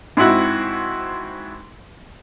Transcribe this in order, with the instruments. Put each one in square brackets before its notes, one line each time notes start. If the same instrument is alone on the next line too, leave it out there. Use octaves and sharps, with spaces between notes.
[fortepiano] G#2 C4 E4 F#4